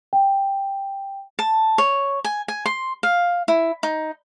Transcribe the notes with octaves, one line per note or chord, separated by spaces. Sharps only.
G5
A5
C#5
G#5
G#5
C6
F5
E4
D#4